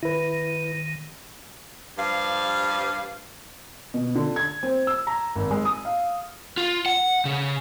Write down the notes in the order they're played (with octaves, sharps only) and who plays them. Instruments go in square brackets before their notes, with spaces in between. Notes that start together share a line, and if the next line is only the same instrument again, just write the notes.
[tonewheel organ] D#3 [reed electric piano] E4 B4
[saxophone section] G2 F3 F5
[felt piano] B2
D3
G#6
C4
E6
A#5
G#1
G#3
D#6
F5
[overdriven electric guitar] F4
F#5
C#3